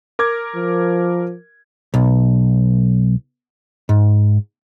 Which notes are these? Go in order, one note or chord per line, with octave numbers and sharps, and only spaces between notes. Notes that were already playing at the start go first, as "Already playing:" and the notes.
A#4 D6 G#6
F3
B1
G#2